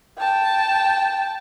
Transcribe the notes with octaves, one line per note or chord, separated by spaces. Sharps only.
G5 A5